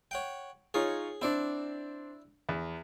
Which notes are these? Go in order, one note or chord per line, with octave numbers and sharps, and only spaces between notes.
C#5 F#5 G5
D#4 F4 G#4 C#5
C4 D4 E4 D5
E2